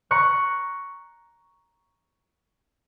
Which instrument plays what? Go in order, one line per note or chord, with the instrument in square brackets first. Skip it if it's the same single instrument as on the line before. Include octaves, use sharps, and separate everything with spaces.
[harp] A#5 C#6 F#6